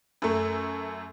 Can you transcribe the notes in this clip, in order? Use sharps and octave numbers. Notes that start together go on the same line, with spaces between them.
F#2 A3